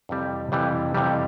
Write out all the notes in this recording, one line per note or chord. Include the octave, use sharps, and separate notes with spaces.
F2 C3 E3 G3
F2 C3 E3 G3
F2 C3 E3 G3